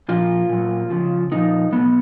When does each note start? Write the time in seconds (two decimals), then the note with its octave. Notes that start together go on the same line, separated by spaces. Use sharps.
0.09 A#2 F3 F4
0.50 A#2 F#3
0.90 C#3 F3
1.31 A#2 F3 D#4
1.72 B2 F#3 B3